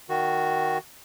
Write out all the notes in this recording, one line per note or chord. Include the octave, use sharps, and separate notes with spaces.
D#3 F#4